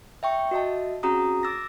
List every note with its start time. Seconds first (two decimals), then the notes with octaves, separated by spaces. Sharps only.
0.23 E5 G5 C#6
0.51 F#4 D#5 E5 A5
1.03 C4 C#4 F#4 G#4 A#5 D#6
1.43 D6 E6 A6 A#6